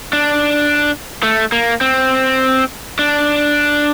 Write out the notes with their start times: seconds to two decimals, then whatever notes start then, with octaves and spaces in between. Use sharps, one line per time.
0.13 D4
1.23 A3
1.52 A#3
1.81 C4
2.99 D4